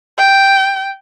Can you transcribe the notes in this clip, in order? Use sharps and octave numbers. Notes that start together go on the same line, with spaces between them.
G5